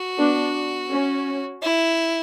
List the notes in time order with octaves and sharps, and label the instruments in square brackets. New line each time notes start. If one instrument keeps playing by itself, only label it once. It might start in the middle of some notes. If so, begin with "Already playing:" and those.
Already playing: [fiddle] F#4
[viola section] B3 D4
C#4
[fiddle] E4